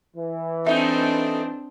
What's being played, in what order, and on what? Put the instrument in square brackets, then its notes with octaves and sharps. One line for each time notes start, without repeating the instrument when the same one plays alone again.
[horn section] E3
[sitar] A3 D#4 [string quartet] C4 D4 [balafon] E5